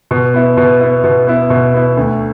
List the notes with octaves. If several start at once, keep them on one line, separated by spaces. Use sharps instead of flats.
B2
B3 E4
B2
B3 E4
B2
B3 E4
B2
B3 E4
D2